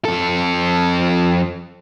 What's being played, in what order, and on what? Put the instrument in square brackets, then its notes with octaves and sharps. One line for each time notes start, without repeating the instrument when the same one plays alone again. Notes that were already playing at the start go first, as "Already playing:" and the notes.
[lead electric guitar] F2 A4